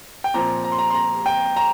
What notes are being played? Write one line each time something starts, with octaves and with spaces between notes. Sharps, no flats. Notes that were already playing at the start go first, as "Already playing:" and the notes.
G5
A#2 F3 C4 A#5
A#5
C6
A#5
C6
A#5
G5
A#5